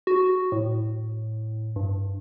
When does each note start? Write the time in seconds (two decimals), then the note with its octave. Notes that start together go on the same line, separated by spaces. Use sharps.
0.07 F#4
0.52 A2
1.76 G2